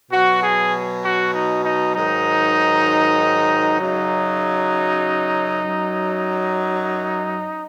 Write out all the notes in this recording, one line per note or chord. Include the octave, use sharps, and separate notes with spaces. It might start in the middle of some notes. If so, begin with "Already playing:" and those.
B2 F#3 F#4
G#4
F#4
D#4
D#4
G#2 D#3 F#3 D#4
F#2 C#3 F#3 D#4
F#2 F#3